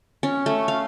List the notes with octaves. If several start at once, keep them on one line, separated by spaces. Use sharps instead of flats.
C#4
A3
F5